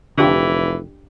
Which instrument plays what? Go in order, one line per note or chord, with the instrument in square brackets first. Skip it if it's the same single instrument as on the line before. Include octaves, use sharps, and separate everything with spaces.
[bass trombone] F1 [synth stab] D3 F4 [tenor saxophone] E3 [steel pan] D4 G4